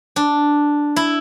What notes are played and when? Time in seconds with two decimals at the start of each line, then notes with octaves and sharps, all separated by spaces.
0.16 D4
0.96 E4